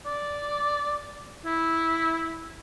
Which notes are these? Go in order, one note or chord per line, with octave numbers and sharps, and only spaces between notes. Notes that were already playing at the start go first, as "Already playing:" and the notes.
D5
E4